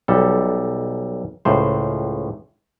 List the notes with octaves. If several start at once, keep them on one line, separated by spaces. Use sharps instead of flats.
B1 G3 A4
C#2 A2 C5